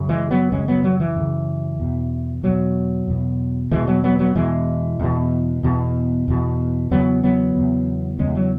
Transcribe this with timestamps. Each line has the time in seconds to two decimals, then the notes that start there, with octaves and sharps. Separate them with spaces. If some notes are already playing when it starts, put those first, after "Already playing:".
Already playing: F#2 C#3
0.09 E3 G#3
0.31 F#3 B3
0.52 F#2 C#3 G#3 C#4
0.68 F#3 B3
0.84 F#3
1.00 E3
1.16 F#2 C#3
1.79 E2 B2
2.43 E2 B2 F#3
3.07 E2 B2
3.71 E2 B2 E3 G#3
3.87 F#3 B3
4.04 F#3 B3
4.19 F#3 B3
4.36 E2 B2 E3 G#3
4.99 E2 B2
5.63 E2 B2
6.28 E2 B2
6.91 E2 C#3 F#3 B3
7.23 F#3 B3
7.55 E2 C#3
8.19 E2 C#3 G#3 C#4
8.35 F#3